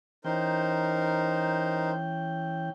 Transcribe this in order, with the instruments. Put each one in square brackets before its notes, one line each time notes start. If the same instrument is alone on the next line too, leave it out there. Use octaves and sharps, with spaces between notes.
[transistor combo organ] E3 C#4 G5 [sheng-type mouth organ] D#4 A#4 C5